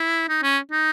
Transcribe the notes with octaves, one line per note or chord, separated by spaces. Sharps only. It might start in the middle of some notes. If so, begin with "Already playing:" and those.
Already playing: E4
D#4
C#4
D#4